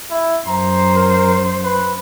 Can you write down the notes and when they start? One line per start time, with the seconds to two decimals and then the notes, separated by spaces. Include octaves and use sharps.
0.11 E4
0.47 F#2 C5 A#5
0.95 A#4
1.64 B4